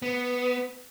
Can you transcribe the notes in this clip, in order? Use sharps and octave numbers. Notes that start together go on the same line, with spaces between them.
B3